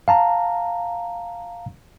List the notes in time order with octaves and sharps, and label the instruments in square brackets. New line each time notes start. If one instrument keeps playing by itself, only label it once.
[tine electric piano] F5 A5 A#5